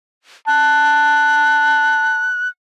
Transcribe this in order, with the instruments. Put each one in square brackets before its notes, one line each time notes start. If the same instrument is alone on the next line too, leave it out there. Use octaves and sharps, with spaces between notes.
[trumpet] A5 [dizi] F#6